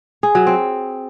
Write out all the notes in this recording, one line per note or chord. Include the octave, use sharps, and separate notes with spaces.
G#4
F#3
C4